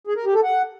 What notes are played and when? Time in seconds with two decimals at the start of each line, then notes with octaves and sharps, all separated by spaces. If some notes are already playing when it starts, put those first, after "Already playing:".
0.07 G#4
0.16 A#4
0.25 G4
0.34 A4
0.43 F#5